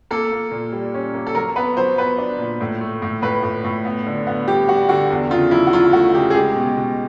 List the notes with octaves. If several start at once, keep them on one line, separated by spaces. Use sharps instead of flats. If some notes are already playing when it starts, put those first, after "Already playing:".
A#3 A4
A#3
A#2
G3
C#4
A#3
A4
F#3 A#4
B3 B4
F#3 C5
B3 B4
D4
A#2
A2
A3
A2
A2 B4
A2
A2
B3
D3
B3
G3 G4
G3 F#4
D3 F#4
E2
C#3 F4
F#3 E4
F#4
F#3 F4
A3 F#4
C#3 G4
G#4
G#3 G4
B2
B2